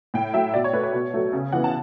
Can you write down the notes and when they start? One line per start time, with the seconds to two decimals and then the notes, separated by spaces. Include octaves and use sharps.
0.14 A2 G5
0.34 F#3 A3 E5
0.54 B2 D5
0.64 C#5
0.73 A3 B4
0.83 C#5
0.93 B2
1.14 F#3 A3
1.33 C#3
1.52 E3 B3 F#5
1.64 A5